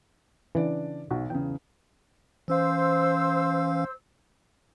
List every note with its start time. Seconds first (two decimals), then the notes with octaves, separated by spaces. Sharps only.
0.55 C#3 E3 D4 D5
1.11 B1 F#4
1.30 E2 C#3 G5
2.48 E3 C#4 C5 F5 E6